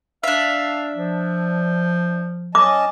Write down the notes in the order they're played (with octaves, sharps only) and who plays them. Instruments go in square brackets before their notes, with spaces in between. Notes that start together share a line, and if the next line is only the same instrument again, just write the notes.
[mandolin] D4 E5 [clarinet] F5
[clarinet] F3
[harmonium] C#4 D#5 A5 [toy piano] D6